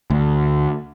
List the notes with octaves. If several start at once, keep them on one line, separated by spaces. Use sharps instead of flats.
D2